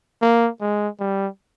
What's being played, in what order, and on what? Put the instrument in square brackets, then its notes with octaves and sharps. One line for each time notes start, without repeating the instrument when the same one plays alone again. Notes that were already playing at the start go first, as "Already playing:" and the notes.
[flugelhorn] A#3
G#3
G3